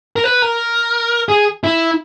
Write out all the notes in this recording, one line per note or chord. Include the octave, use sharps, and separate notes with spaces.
A#4
B4
A#4
G#4
E4